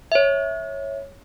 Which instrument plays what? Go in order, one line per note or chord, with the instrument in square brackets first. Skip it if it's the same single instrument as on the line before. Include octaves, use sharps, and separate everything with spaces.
[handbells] C#5 E5